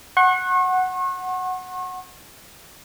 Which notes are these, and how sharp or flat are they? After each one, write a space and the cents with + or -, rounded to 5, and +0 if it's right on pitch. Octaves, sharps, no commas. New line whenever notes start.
F#5 +0 C#6 -40